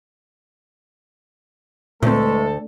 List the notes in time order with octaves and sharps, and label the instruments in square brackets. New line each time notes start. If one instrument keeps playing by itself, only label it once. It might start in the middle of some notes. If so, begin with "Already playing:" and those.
[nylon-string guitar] D2 [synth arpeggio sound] A#2 C4 [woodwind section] E3 G#3 A3 [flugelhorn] A4